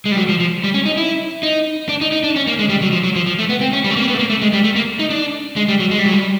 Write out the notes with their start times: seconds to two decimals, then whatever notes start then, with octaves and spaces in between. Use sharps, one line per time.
0.05 G#3
0.12 G3
0.17 F#3
0.29 F3
0.40 F3
0.64 G3
0.74 C#4
0.85 D#4
0.97 E4
1.43 D#4
1.89 D4
2.01 D#4
2.12 D#4
2.24 D4
2.36 C#4
2.47 A#3
2.59 G#3
2.69 G3
2.82 F#3
2.92 F3
3.04 F#3
3.16 F3
3.26 F3
3.39 A3
3.49 B3
3.61 C4
3.73 C#4
3.84 G3
3.91 A3
3.96 A#3
4.02 C4
4.08 B3
4.14 A3
4.19 A#3
4.30 A3
4.42 G#3
4.53 G3
4.64 A3
4.76 A#3
4.99 D#4
5.10 D4
5.56 G#3
5.68 G3
5.79 F#3
5.91 G#3
5.99 G3
6.06 F#3
6.13 G3